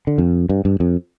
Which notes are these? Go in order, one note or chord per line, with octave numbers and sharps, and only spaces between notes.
D3
F2
G2
G2
F2